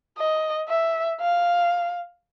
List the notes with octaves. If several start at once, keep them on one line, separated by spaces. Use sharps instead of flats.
D#5
E5
F5